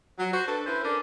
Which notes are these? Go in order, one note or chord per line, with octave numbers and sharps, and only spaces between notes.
F#3
F#4 C5
D4 A4 B4
C#4 E4 B4 C5
C#4 D4 A4 A#4